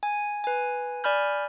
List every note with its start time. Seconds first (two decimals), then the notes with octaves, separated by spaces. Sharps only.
0.03 G#5
0.44 B4 G#5
1.04 D5 G#5 B5 F6 G6